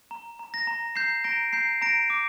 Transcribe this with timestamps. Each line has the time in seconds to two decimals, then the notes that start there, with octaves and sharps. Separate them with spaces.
0.11 A#5
0.39 A#5
0.54 A#6
0.67 A#5
0.95 A#5 G6 C7
1.24 A#5 A#6 D7
1.53 A#5 G6 C7
1.82 A#5 A#6 D7
2.10 D6